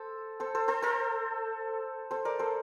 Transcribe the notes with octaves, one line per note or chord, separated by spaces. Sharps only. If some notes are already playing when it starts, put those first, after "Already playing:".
Already playing: A4 C5
A4 C5
A4 C5
A4 C5
A4 C5
A4 C5
A#4 D5
A4 C5